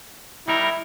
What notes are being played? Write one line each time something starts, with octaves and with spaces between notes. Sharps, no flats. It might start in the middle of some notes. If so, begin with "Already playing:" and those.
G3 D#4 E4 A#4